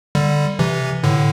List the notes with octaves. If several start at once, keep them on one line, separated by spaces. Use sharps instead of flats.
D3 G3
C3 E3
A2 D3